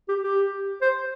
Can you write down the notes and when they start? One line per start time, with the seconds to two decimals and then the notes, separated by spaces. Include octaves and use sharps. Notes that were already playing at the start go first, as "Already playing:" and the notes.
0.09 G4
0.23 G4
0.82 C5